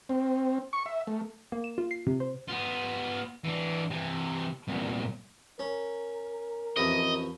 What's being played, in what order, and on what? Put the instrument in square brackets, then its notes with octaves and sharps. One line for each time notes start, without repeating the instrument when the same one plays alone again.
[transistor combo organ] C4
C#6
E5
A3
[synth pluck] A#3
E7
F4
C7
C3
C5
[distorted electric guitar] B3 F4
E3 D4
C3 E3
C2 A#2
[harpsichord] C#4 [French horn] A#4
[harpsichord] A1 F2 E4 [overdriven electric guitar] D#5